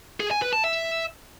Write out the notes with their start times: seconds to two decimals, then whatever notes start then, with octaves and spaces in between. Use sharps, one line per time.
0.20 G#4
0.31 G#5
0.42 B4
0.53 A5
0.64 E5